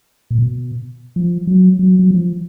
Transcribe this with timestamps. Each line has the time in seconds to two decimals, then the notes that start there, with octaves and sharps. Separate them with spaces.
0.31 A#2
0.39 B2
1.16 F3
1.47 F#3
1.79 F#3
1.99 F#3
2.11 F3